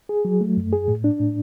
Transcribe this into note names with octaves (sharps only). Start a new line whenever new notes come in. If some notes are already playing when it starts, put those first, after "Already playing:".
G#4
F#3
A3
F#2
G#4
A2
D4
A2